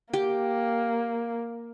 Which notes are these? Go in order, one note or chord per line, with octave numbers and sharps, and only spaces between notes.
A#3 G4